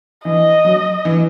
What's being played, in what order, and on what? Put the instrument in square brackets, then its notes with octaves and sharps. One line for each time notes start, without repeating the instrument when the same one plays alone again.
[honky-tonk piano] E3 [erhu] D#5
[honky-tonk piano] F#3
E3